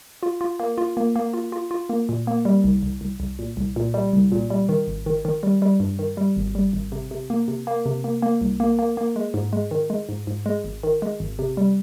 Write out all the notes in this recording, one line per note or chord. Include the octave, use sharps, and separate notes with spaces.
F4
F4
A#3
F4
A#3
A#3
F4
F4
F4
A#3
A#2
A#3
G3
C2
C2
C2
C2
A#2
C2
A#2
G3
C2
A#2
G3
D#3
G#1
D#3
D#3
G3
G3
G2
D#3
G3
G#1
G3
G#1
C3
C3
A#3
C3
A#3
C3
A#3
A#3
C2
A#3
A#3
A#3
G#3
G#2
G#3
D#3
G#3
G#2
G#2
G#3
G#1
D#3
G#3
G#1
C3
G3